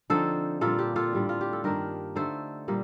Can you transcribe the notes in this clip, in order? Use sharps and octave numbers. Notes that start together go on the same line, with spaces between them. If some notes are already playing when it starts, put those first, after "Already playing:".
D3 F3 C4 D#4 A4 C5
A#2 G3 D4 F4 A4
G4
F4 A4
A2 G3 D4
F4
G4
A4
G2 D#3 A#3 D4 G4 A#4
D3 A3 D#4 A4 C5
A#2 G3 A#3